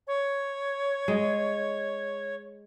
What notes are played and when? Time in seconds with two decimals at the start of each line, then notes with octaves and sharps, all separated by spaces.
0.07 C#5
1.08 G#3